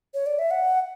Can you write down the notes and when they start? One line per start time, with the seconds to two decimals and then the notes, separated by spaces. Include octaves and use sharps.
0.14 C#5
0.26 D5
0.39 E5
0.51 F#5